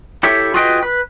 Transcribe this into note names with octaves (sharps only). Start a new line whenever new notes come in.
E4 G4 A4 C#5 E5
F4 F#4 G#4 B4 D#5 G5
B4